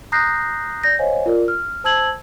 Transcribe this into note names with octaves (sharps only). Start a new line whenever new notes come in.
A#5 D#6 F#6 G6 A#6 C7
D5 G6 A#6
C5 C#5 D#5 F5 G#5
F4 A#4 D5
F6
C5 A5 E6 G#6 F#7